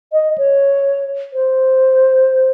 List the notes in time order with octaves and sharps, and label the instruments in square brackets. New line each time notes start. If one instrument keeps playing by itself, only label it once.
[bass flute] D#5
C#5
C5